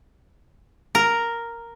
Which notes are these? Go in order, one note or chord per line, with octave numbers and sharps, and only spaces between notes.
A#4